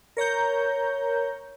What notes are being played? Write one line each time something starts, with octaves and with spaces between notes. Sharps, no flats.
A#4 C#5 A#5 G6